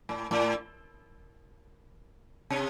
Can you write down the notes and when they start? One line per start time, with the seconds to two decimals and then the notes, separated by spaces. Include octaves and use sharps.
0.09 A2
0.31 A2
2.50 C3